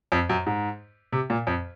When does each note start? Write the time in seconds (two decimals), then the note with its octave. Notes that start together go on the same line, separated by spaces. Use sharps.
0.12 F2
0.29 F#2
0.46 G#2
1.12 C3
1.30 A#2
1.47 F2